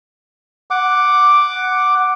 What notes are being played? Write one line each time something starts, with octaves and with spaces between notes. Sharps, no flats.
F#5 D6